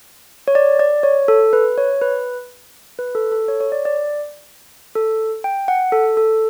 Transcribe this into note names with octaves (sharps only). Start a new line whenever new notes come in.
C#5
D5
D5
C#5
A4
B4
C#5
B4
B4
A4
A4
C#5
C#5
D5
D5
A4
G5
F#5
A4
A4